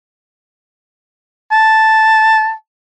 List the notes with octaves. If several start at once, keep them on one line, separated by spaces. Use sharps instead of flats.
A5